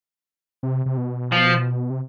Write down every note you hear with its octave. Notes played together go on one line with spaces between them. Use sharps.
C3
C3
B2
F3
C3